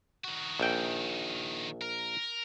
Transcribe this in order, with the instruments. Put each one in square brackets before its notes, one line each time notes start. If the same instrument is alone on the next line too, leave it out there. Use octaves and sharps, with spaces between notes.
[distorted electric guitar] D#3 F#4
[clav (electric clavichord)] A#1 G5
[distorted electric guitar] A#4